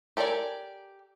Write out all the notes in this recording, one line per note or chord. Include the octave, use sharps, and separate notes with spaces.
G4 A4 A#4 D5 G#5